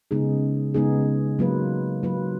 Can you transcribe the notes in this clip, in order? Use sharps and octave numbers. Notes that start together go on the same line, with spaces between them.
C#3 G#3 B3 D#4 G#4
C#3 G#3 B3 D#4 G#4
F#3 A#3 F4 B4
F#3 A#3 F4 B4